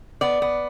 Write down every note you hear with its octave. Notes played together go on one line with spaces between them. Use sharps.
B3 D5
B3